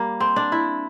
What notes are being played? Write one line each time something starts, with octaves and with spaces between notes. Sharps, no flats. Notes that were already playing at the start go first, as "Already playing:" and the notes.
Already playing: G3 A#3
C4
D4
E4